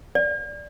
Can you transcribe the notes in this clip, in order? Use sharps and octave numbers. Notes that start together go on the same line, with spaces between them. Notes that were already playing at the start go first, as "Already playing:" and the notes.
D5